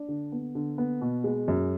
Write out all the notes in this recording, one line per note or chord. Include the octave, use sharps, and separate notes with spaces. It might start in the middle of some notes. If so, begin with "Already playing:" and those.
Already playing: D4
D3
B3
D3
B3
B2
G#3
F#2